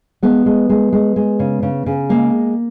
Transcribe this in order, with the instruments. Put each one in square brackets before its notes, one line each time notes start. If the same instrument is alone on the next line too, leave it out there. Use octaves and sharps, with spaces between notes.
[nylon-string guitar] G#3 B3
G#3
G#3
G#3
G#3
C#3
C#3
C#3
G#3 A#3